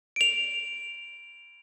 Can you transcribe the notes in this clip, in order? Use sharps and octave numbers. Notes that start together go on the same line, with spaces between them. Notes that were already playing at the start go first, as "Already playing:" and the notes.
D7 F7